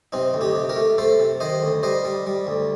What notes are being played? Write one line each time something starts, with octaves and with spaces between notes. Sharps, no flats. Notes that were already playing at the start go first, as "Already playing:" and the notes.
C3 C4 D#4
D2
D#4 G4
C3
G4 A#4
A3
A3 A4 C5
C3
D#3 C5 D#5
D2
G3 C5 D#5
G3
G3
D2